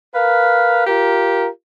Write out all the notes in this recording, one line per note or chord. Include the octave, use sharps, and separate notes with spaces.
A#4 B4 F5
F4 G4 A#4